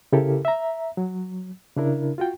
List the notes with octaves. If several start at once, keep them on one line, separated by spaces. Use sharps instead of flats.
C#3 E4 G4 A4 A#4
E5 A#5
F#3
C#3 D4 E4 A#4
F4 F#4 G5